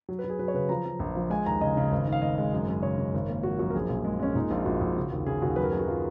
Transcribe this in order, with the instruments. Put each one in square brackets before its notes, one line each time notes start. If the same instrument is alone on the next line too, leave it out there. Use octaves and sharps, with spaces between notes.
[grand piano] F#3
B4
F#3
G#4
F#3 B4
C#5
C#3 B4
F3 A#5
F3
A#1
F3
G#3 G#5
D#2 A#5
C#3 D#5
C#3
G#1
G#2
F5
G#1 D#5
G#3
F#2
F#2
C#3 C#5
C#3
G#1
A#3
F3 F#4
F#2 F#4
A#4
A#1 G#4
A#2
G#3
G#3 C#4
A#2 D#4
A#1 F4
A#1 F#4
A#1
C#3
D#2
C#3 G#4
D#2 F#4
F#2 B4
A#4
F#2 G#4
F#4
F#3 F4